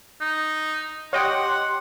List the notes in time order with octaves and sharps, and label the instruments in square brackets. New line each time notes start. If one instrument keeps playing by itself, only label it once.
[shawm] D#4
[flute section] G4 C6 [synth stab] C#5 D#5 G5 [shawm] F#5